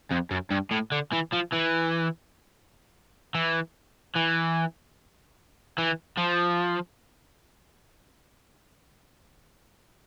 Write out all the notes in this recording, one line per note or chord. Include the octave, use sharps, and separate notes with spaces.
F2
F#2
G2
A2
D3
E3
F3
E3
E3
E3
E3
F3